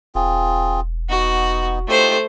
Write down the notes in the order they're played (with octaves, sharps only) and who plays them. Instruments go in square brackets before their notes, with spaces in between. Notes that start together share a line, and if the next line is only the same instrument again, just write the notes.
[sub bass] E1 [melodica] C4 F4 G#4
[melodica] B3 D#4 [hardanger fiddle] F#4
[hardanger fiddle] A3 C5 [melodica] D#4 F4 G4